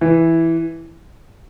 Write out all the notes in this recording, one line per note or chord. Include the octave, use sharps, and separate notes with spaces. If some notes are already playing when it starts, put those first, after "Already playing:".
E3